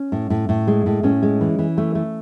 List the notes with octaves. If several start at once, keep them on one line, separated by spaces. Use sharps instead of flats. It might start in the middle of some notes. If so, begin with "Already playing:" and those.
Already playing: C#4
A2
A2
A2
G#3
A2
A2 C#4
G#3
E3
E3
A3
A3